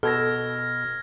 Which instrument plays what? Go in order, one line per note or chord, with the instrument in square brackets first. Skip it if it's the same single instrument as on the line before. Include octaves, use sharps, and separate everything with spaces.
[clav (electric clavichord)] B2 [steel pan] A4 [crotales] F6 G#6 A#6